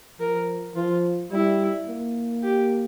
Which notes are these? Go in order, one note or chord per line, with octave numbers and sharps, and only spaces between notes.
F3 A#4
F3 F4
G3 E4
A#3
G4